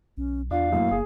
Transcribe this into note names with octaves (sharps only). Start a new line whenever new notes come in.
B1 C#4
E2 D4 F4 F5
F#2 A2 A#3
F1 G#4